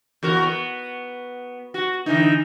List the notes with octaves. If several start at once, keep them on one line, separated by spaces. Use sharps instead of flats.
E2 F#4 A#4
B3
F#4
D3 E3 D#4